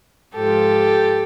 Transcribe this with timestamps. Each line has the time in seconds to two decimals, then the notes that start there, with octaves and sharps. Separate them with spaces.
0.35 G#2 F3 G4 A4